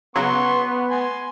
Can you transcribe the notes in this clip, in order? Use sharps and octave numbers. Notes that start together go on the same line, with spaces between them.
C#3 F#3 B3 C6 C#6
G#5 C6